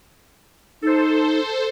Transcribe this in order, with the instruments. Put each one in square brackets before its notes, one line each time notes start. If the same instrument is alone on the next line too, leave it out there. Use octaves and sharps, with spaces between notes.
[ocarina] D#4 [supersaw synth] A4 C5